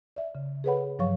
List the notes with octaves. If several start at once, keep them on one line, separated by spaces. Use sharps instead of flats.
D5 E5
C#3
G#4 A4 B4 C#5 F#5 B5
G2 F3 F#3 C#5 F5 C#6